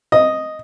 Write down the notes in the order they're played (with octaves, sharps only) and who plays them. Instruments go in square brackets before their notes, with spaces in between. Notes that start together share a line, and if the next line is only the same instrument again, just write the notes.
[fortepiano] D#5